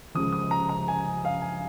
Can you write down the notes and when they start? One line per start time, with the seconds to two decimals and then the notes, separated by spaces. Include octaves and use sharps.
0.15 C#2 C#3 F3 D#6
0.32 D#6
0.51 A#5
0.69 A#5
0.88 G#5
1.25 F5
1.42 G#5